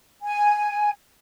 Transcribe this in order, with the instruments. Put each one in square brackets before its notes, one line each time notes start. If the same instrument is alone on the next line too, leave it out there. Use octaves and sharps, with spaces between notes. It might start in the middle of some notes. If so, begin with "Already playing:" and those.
[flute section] G#5